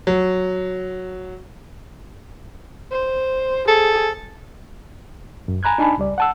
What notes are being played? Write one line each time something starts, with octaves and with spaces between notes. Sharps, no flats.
F#3
C5
G#4 A4
F#2
G#5 A#5 B5 F#6 G#6
D4 D#4 G#5 A5 B5
C#2 G3 D5
F#5 A5 E6